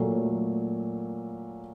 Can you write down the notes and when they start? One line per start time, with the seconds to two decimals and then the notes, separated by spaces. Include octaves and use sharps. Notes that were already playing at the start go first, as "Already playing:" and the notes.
Already playing: A#2 F#3 A3